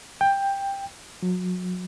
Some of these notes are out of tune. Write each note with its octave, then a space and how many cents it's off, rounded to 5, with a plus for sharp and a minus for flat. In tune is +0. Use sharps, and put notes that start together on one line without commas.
G5 +10
F#3 -30